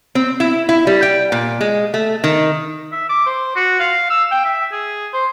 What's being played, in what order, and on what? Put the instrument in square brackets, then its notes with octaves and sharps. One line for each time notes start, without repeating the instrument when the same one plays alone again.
[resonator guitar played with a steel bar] C4
E4
E4
G3
G5
A#2
G#3
A3
D#3
[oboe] E5
D6
C5
F#4
F5
E6
G5
E5
G#4
C5